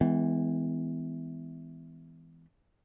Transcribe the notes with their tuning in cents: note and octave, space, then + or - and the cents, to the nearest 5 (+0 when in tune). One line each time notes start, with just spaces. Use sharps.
E3 -15 G#3 +0 B3 +30